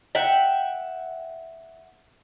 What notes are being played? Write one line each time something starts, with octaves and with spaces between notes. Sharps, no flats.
E5 F#5 G5